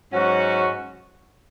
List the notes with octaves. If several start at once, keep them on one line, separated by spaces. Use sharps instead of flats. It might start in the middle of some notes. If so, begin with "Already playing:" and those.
G#2 F#3 C#4 F#4